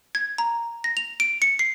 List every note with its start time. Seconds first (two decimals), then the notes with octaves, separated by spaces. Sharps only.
0.15 G#6
0.38 A#5
0.84 A#6
0.97 F7
1.20 D7
1.42 C#7
1.59 C7